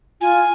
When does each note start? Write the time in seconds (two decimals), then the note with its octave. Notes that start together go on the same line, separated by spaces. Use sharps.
0.21 F4 G#5